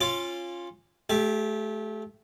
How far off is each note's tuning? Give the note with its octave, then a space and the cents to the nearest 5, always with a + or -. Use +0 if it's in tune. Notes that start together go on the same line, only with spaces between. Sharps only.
C#4 -20 F4 +0 D6 +0
A3 -30 G4 +0 E5 +25